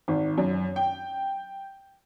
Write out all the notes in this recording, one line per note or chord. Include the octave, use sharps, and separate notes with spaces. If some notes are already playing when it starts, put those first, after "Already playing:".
G#1
F#2
G5